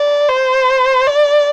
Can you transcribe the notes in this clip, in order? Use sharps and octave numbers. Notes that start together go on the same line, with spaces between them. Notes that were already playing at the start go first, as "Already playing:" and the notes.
Already playing: D5
C5
D5